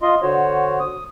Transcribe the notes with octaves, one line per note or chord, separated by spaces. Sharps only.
F4 D#5 C6
D3 F#4 C5 C#5
D#6